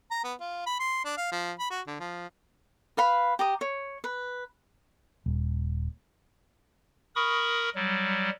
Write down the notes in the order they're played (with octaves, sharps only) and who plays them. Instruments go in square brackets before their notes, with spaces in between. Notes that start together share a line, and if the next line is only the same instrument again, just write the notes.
[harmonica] A#5
B3
F4
B5
C6
D4
F5
F3
B5
F#4
D3
F3
[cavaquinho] B4 F5 B5
G4 A#5 D#6
C#5
B4
[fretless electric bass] D#1
[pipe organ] A#4 B5 C#6 D#6
F#3 G3